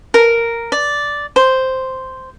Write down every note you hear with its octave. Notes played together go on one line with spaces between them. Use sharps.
A#4
D5
C5